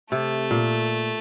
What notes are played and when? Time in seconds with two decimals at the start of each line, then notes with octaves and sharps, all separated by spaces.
0.12 C3 A3
0.51 A#2